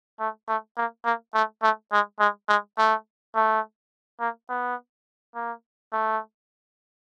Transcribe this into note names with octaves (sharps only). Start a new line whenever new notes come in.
A3
A3
A#3
A#3
A3
A3
G#3
G#3
G#3
A3
A3
A#3
B3
A#3
A3